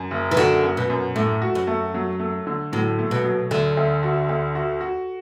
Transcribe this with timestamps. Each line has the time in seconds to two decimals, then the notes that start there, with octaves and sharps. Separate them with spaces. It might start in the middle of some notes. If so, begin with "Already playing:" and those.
Already playing: F#2
0.11 F#1
0.31 E3
0.37 D3 F#4
0.63 F#2
0.77 B2
0.90 F#2
1.16 A2 A3
1.42 F#4
1.55 F#2
1.67 A3
1.94 F#3
2.20 A3
2.47 D3
2.72 A2 F#3
2.99 A3
3.11 B2
3.24 F#3
3.51 D2 D3
3.77 D2
4.03 F#4
4.29 D2
4.55 F#4
4.81 F#4